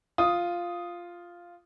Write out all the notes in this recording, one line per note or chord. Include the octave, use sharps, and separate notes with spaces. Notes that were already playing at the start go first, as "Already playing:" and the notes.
F4 D#6